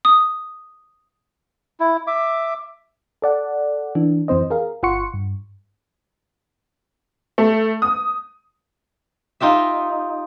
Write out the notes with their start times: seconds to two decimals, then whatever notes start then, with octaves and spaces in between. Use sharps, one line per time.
0.05 D#6
1.80 E4
2.07 E5 D6
3.22 A4 D5 F#5
3.95 E3 D4
4.28 F2 E3 C4 C5 D#5
4.50 G#4 A#4 F5
4.83 G1 F4 F#5 C6 C#6 C#7
5.14 G2
7.38 A3
7.82 D#6
9.40 D#4 F4 G4 E5